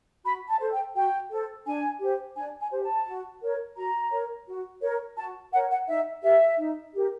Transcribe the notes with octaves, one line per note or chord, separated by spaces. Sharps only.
F#4 B5
A5
A4 C5
G5
F#4 G5
A4 C5
D4 G#5
G4 C5
D4 G#5
G#5
G4 C5
A5
F#4
A#4 C#5
F#4 A#5
A#4 C#5
F#4
A#4 C#5
F#4 A5
A#4 C#5 F#5
F#5
D#4 E5
G4 A#4 E5
D#4
G4 A#4